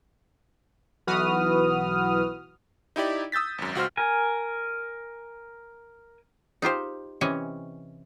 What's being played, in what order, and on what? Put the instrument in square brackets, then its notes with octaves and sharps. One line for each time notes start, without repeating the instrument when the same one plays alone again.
[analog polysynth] B1 E3 F#4 B4 D#6 F6
[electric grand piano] D#4 E4 G4 D5
D#6 E6 G6 A6 B6
G#1 F#2
C#2 F#4 C5 F6
[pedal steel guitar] A#4 G#5
[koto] D#4 F4 G4 C5
C3 E3 C#4 C#5 D#5 G#5